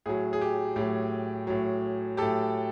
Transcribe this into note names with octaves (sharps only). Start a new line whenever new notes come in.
A2 F#3 G#4
G#4
G4
A2 F#3 G4
A2 F#3
A2 F#3 G4 A4